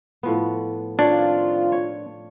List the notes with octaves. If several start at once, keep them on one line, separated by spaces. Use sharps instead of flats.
A2 F3 B3
D#3 C4 D4 F4 C#5 D5
C#5